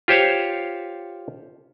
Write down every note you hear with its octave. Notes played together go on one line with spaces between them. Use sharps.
F4 G4 C5 C#5 F5